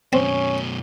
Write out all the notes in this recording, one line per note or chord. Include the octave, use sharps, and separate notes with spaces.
F#2 B2 C4 C#4